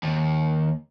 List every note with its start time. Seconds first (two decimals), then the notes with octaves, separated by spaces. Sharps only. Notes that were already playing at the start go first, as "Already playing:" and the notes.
0.03 D#2